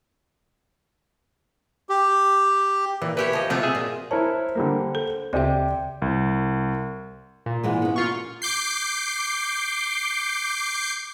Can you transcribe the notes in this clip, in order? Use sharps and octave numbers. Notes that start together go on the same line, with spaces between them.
G4
A#2 E3
E3 G4 B4 C#5
F3 D#5
C3 F3 A3 C4 F4 F#4
G#4 E5
A#2
E4 A#4 C5 C#5 A5
D3 G3 A#3
A4
D2 C#3 C4 G4 D5 E5 G5
C2
A#2
G#2 E3 G#3
B3 C#4
A#2 F4 C#6
D6 G6 C7